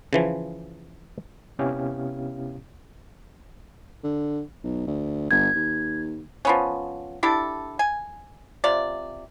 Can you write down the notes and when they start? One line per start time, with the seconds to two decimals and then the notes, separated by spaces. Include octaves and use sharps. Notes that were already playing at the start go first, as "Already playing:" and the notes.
0.13 C#3 E3 F3
1.59 C3 B3 C#4 E4 G4 F5
4.04 D3
4.64 B1
4.87 D2
5.31 G1 G#6
5.55 D#2
6.45 F3 B3 C#4
7.23 D4 E4 G4 A4
7.79 G#5
8.64 C3 F4 D5